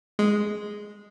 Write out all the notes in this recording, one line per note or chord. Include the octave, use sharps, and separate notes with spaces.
G#3